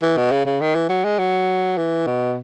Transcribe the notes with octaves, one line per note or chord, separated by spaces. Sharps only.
E3
B2
C#3
C#3
D#3
E3
F#3
G#3
F#3
E3
B2